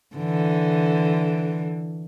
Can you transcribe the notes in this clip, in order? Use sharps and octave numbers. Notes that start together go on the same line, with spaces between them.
D3 E3